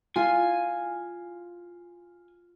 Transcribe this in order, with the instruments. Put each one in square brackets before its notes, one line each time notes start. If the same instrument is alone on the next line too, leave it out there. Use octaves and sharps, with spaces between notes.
[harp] F4 [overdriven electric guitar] G#5